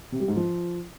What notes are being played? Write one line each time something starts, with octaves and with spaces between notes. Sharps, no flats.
C3
G3
G#2
F3